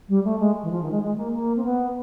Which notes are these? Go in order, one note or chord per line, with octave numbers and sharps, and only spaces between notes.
G3
A3
G#3
E3
F3
D#3
G#3
G#3
A#3
A#3
C4
B3